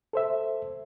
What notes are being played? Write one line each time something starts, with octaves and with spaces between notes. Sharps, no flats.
A4 C5 E5